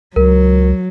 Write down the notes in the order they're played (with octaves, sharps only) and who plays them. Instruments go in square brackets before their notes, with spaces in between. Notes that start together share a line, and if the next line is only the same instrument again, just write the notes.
[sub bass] C#2 [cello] F#3 [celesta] A#4